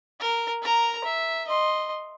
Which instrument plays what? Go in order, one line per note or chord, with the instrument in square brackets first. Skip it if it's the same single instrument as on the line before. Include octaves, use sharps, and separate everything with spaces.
[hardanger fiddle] A#4
A#4 A#5
E5
D#5 C6